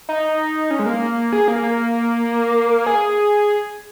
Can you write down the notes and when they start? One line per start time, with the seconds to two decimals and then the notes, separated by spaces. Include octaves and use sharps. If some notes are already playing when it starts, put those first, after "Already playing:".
0.09 D#4
0.71 C#4
0.79 G#3
0.86 A#3
1.33 G#4
1.48 A#3
1.63 A#3
2.86 G#4